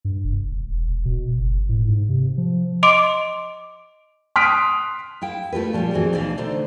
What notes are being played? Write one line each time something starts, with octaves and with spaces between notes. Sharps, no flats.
G2
F1
E1
E1
B2
F#1
A2
G#2
C3
F3
D#5 C6 D6 D7
C6 D#6 F6 F#6 B6 D7
E4 F5 G5
A3 F4 G4 B4
A#2 F3 G3 C#4 G4
E3 C4 F#4 G#4
D2 B2 E3 D#4 D5 F5
D3 A3 D#4 C5